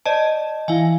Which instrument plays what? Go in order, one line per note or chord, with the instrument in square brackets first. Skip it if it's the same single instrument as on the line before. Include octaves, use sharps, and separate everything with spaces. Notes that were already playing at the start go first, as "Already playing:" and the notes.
[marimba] C5 [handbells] D5 D#5 A5
[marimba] E3 E4 [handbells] F5 G#5